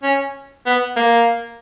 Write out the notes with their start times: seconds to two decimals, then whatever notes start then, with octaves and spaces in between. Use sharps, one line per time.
0.03 C#4
0.66 B3
0.96 A#3